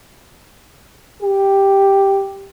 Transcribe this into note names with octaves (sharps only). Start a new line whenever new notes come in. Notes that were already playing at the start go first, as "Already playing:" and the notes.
G4